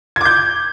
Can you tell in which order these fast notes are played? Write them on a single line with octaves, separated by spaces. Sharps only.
G#6 D6 G6